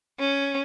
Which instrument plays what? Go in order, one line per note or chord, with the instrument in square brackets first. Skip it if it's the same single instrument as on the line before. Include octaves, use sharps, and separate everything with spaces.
[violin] C#4